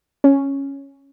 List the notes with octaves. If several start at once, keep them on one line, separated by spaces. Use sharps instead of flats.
C#4